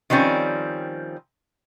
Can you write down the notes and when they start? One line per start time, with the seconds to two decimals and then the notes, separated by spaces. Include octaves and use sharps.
0.10 D#3 F3 G3 C4 C#4